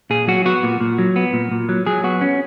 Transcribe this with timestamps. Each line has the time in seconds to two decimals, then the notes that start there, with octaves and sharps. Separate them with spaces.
0.10 A#2 G#4
0.27 F#3 F#4
0.45 B3 F#4
0.63 A#2
0.81 A#2
0.98 F#3
1.16 B3
1.33 A#2
1.51 A#2
1.69 F#3
1.86 F#3 G#4
2.04 B3 F#4
2.21 C#4